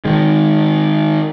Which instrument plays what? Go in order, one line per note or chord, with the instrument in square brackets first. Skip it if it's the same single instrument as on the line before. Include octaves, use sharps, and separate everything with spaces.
[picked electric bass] D#3 G#3